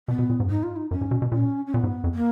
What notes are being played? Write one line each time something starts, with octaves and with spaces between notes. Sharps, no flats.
B2 B3
B2
A#2
G#2
F#2
G#2 D#4
F4
D#4
F#2 C#4
G#2
B2
B2
A#2 C#4
C#4
A#2 B3
G#2
F2
A#3